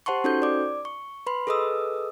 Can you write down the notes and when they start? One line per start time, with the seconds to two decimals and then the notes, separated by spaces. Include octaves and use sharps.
0.06 G4 C5 F#5 A5 C6 C#6
0.24 C#4 D#4 F#4 A4 C5 G6
0.42 D5 D6
0.85 C#6
1.27 B4 B5 C6
1.47 G#4 A4 B4 D#5 D#6 E6